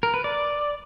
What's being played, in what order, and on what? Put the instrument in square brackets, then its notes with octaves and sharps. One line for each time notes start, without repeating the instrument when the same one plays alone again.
[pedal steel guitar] A#4
B4
D5